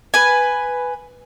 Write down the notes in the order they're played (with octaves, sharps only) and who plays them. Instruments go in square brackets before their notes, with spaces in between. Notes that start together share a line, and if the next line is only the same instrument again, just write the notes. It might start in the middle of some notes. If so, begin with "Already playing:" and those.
[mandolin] B4 G#5